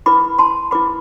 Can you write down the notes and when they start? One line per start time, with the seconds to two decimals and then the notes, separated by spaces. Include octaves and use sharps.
0.06 E4 B4 B5 D6
0.38 A5 C6
0.71 E4 B4 B5 D6